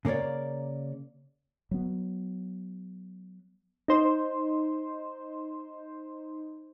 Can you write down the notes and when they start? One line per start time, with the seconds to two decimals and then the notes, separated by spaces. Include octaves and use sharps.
0.05 C#3 A#3 A#4 C#5 D5
1.71 F#3 B3
3.88 D#4 C5